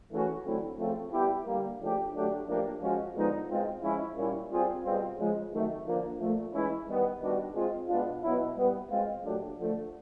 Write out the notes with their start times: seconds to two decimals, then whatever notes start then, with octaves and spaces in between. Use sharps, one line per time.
0.11 C#3 E3 A3 C#4 F#4
0.45 D3 F#3 A3 C4 E4
0.78 C#3 F3 A3 C4 F4
1.12 G3 B3 E4 G4
1.46 D3 G3 A#3
1.80 C#3 F3 A3 D4 G4
2.14 D3 F#3 A3 D4 G4
2.48 A2 F3 A#3 D4 G4
2.81 F3 G#3 C#4 F#4
3.15 D3 F3 G#3 B3 D#4
3.49 B2 G#3 C4 F4
3.83 F3 G#3 C#4 E4
4.16 A#2 G3 A#3 C#4 E4
4.50 G3 C4 F4 G#4
4.84 B2 G3 C4 F4 G#4
5.18 C#3 F3 G#3
5.52 C3 D#3 F#3 A3
5.85 D3 F3 A#3 D4
6.20 A#2 F3 A3
6.53 E3 G#3 C#4 E4
6.87 D#3 G3 B3
7.21 D#3 G3 B3 D4 F#4
7.55 G#3 C4 F4 G#4
7.88 B2 G#3 B3 D4 F4
8.23 B2 F#3 B3 E4
8.56 A#2 G3 B3
8.90 B2 G#3 C4 F4
9.24 A#2 F#3 A3 D4 G4
9.58 D3 F3 A3